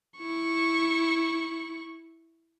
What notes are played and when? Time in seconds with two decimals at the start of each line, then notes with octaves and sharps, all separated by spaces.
0.19 E4 C#6